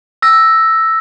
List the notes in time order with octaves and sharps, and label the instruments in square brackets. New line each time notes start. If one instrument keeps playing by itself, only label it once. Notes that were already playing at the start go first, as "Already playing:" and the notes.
[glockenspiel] E6 A#6